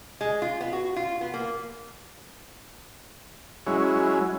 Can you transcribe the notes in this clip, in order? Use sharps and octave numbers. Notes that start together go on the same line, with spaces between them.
G#3
F4
B3
F#4
F4
B3
A#3
F#3 G#3 C#4 E4